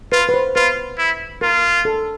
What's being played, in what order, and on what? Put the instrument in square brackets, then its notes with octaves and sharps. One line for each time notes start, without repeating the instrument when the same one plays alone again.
[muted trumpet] F4 [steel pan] B4
[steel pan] B4
C5
[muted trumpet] F4 [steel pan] B4
[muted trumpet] E4
[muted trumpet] F4 [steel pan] A#4
[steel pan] A4